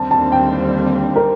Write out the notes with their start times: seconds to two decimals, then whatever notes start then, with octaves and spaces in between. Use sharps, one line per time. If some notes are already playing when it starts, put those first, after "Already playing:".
Already playing: D#2 D3 G3 C4 A5
0.11 A5
0.32 G5
1.16 A#4